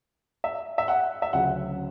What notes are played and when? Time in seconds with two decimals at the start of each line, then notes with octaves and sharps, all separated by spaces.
0.44 E5
0.78 E5
0.88 F#5
1.22 E5
1.33 D2 C#3 F#3 F#5